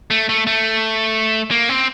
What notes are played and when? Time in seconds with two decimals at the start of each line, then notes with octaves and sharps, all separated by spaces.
0.11 A3
0.29 A3
0.47 A3
1.51 A#3
1.69 C4